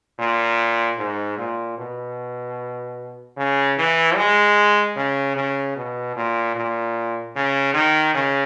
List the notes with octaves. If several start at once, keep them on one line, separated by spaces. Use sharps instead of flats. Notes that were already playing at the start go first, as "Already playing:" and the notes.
A#2
G#2
A#2
B2
C#3
E3
G#3
C#3
C#3
B2
A#2
A#2
C#3
D#3
C#3